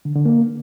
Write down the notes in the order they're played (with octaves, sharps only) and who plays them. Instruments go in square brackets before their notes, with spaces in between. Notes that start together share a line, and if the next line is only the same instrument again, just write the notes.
[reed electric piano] D3
D3
A#3